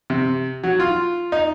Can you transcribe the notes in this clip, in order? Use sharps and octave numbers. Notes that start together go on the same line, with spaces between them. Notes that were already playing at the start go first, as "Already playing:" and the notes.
C3
F#3
F4
D#4